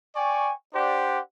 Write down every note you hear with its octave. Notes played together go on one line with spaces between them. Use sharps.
D5 G5 G#5 C#6
D4 G4 C5 D5 F#5